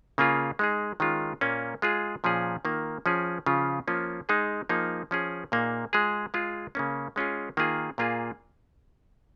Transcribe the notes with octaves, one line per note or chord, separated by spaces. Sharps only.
C#3 A#3 C#4 F4 G#4
G#3 D#4 G#4
D#3 G#3 C#4 F4
A#2 A#3 C#4
G#3 F4 G#4
A#2 F3 C#4 G#4
D#3 A#3 F4
F3 C#4 G#4
C#3 F3 C#4 F4
F3 A#3 C#4 F4
G#3 D#4 G#4
F3 A#3 D#4 G#4
F3 C#4 G#4
A#2 A#3 D#4 G#4
G#3 F4 G#4
G#3 F4 G#4
C#3 A#3 C#4
G#3 C#4 F4 G#4
D#3 A#3 F4 G#4
A#2 A#3 F4 G#4